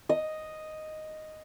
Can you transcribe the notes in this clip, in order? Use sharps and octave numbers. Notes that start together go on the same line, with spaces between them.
D#5